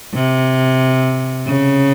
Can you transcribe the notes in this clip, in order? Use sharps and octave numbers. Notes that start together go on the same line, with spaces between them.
C3
C#3